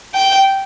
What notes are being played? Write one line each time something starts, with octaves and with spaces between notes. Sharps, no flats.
G5